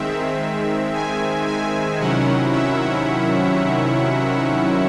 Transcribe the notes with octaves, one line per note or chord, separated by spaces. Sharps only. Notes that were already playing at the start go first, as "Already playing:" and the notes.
Already playing: D#3 G#3 C4 E5
G#5
G#5
C3 D#3 F#3 C#4 E4 F#5
E5